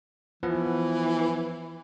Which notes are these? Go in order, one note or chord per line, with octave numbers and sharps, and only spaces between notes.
E3 F3 B3 B4